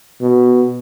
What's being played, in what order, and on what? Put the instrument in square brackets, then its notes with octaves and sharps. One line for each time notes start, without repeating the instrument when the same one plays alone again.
[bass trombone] B2